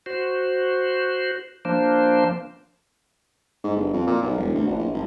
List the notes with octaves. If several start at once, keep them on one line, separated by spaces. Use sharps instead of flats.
F#4 C5
F3 A#3 D4 C5
G#2
G1
F2
A#2
B1
E1
D2
A1
A#1
G#1